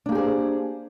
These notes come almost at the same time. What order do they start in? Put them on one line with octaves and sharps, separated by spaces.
D4 A#3 G4 G#4 C5